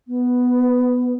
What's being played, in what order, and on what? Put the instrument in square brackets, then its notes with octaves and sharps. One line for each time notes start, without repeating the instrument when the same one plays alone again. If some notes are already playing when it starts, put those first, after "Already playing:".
[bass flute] B3